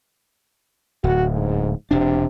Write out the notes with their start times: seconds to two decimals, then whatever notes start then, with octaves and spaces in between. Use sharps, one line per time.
1.04 D1 F#4
1.34 G#2
1.91 E1 C3 D4